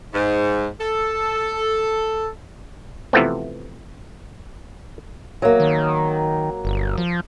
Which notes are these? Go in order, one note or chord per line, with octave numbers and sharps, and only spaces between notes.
G#2
A4
C3 E3 F3 A3 B3 C4
F#3 A#3
D#3
G1
F3